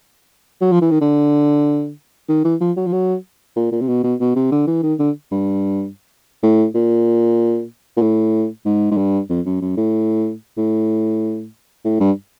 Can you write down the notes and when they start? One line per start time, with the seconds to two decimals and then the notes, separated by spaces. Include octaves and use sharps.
0.61 F#3
0.72 F3
0.81 E3
0.91 D#3
1.01 D3
2.29 D#3
2.44 E3
2.61 F3
2.77 F#3
2.87 F3
2.93 F#3
3.56 A#2
3.72 A#2
3.81 C3
3.88 B2
4.04 B2
4.20 B2
4.36 C3
4.51 D3
4.67 E3
4.83 D#3
4.99 D3
5.32 G2
6.43 A2
6.75 A#2
7.97 A#2
8.02 A2
8.66 G#2
8.91 G#2
8.97 G2
9.29 F2
9.46 F#2
9.61 F#2
9.77 A2
10.57 A2
11.85 A2
12.00 G2